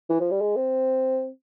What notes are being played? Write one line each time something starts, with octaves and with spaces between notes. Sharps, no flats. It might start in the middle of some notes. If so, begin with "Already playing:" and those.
E3
F3
G3
G#3
C4